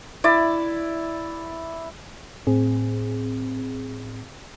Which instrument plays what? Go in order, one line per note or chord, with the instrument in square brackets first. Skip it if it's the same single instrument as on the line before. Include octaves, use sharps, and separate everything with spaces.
[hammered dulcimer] E4 D5
[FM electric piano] A2 C4 G#4